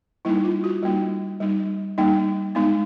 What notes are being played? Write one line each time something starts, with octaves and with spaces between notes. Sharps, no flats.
G3 A#3 D#4 E4
F4
F#4
G3 A#3 D#4 F4
G3 A#3 D#4
G3 A#3 D#4
G#3 B3 D#4